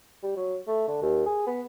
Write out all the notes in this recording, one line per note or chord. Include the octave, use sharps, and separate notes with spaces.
G3
F#3
A3
D3
D#2
G#4
B3